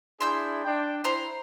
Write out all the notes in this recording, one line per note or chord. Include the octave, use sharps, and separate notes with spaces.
D4 E4 G#4 C6 E6 G6
D4 G5
E4 C5 A#5 C6